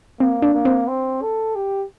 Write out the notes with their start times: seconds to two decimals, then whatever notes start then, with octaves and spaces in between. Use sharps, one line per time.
0.20 A#3 C4
0.42 D4
0.54 A#3
0.65 C4
0.88 C4
1.22 A4
1.55 G4